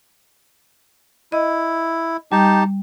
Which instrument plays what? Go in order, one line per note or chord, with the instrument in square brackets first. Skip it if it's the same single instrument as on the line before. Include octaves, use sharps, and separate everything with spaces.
[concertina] E4 [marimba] D#5
[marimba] G3 [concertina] D#4 G4 A5